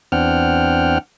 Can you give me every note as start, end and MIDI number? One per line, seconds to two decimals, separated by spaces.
0.12 0.98 40
0.12 0.98 60
0.12 0.98 62
0.12 0.98 78
0.12 0.98 79
0.12 0.98 89